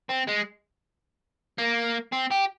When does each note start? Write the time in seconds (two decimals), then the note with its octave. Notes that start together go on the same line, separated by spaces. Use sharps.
0.10 C4
0.29 G#3
1.58 A#3
2.13 C4
2.31 G4